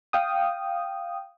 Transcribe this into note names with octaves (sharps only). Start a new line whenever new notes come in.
F5 G5 D#6